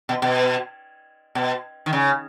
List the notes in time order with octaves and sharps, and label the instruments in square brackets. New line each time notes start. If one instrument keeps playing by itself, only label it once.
[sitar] B2
B2
B2
D#3
C#3